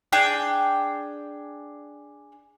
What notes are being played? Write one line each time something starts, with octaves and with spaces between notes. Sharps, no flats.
D4 G#4 G5